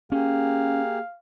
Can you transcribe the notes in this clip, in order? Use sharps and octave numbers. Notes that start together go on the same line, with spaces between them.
A#3 C#4 G4 G#4 F5